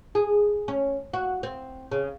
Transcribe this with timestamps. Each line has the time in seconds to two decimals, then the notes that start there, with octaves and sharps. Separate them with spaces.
0.15 G#4
0.68 C#4
1.14 F#4
1.43 C4
1.92 C#3